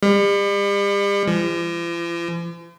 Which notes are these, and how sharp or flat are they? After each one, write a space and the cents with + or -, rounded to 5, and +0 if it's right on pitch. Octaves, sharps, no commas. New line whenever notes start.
G3 +40
F3 -45